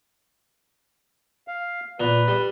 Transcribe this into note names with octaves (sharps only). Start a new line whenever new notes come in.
F5
A#2 B4
G3